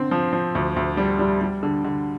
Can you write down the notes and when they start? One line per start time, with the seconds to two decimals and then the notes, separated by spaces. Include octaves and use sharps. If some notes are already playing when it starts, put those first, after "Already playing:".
Already playing: D3 C4
0.11 F3
0.33 F3
0.55 D2
0.76 D2
0.97 G3
1.19 G3
1.41 G3
1.63 D3
1.84 D3